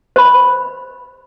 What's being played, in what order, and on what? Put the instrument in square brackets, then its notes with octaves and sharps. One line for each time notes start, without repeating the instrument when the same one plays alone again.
[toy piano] C5 B5